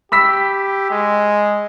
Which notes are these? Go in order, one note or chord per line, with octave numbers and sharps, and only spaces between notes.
G4 B5 E6 B6
G#3